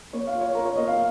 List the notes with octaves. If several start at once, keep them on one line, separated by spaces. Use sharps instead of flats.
A#3 C#5
F5
F4
C#5
F4 A#4
C#5
A#3 D#5
F5